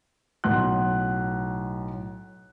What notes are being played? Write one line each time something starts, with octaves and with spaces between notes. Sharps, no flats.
B1 A2 F#5 C6 F#6